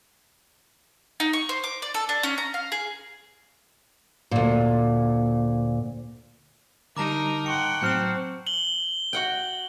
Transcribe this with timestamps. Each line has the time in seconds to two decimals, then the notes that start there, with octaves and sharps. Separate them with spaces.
1.20 D#4
1.33 C#6
1.49 C5
1.64 D6
1.82 D5
1.94 A4
2.09 D4
2.23 C#4
2.38 A#5
2.54 F5
2.72 G#4
4.31 D2 A#2
6.97 D3 G3 D#4 A#4 A5 A#5 D6
7.46 F#5 G5 C6 C#6 C#7
7.82 A2 F#3 C4 F6 G6 C#7 E7
8.47 F#7 G7
9.13 F#4 F#5 G5